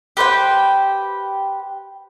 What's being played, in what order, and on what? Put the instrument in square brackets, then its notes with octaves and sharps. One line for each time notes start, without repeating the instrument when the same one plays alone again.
[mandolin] G4 B4 C5 G5